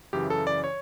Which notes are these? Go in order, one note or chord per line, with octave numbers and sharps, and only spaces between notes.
F#2 C#3 E3 G4
A4
D5
C#5